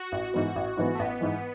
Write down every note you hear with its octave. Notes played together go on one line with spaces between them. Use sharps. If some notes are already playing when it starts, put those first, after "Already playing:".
Already playing: F#4
A1
G#2 E3 B3
A1
G#2 E3 B3
A3
A1 B3
G#2 E3